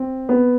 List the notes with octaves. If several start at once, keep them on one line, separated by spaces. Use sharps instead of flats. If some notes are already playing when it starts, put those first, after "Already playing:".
Already playing: C4
B3